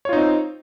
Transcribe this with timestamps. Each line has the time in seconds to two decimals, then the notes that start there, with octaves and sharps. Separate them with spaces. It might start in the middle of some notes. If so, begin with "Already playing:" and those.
0.05 C#5
0.09 F4
0.13 D#4
0.17 C4